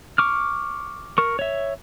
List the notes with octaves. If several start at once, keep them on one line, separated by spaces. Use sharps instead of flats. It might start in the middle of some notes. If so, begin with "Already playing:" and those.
C#6 D6 F6
A#4 C#6
C#5 E5